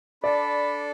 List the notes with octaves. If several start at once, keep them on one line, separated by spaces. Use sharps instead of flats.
D4 A4 D5 B5